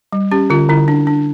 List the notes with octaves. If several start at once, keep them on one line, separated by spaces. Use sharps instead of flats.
G3
C#4 G4
D3 F4
D3 E4
D4
D4